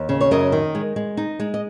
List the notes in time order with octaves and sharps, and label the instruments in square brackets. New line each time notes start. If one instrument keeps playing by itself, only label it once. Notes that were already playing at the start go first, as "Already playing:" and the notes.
Already playing: [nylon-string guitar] D#2
C#3
C#5
F#2 A#4 D#5
D#3
G#3
G#3
D#4
G#3
D#5